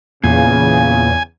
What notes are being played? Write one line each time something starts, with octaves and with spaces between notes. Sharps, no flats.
E2 A#2 C#3 G#5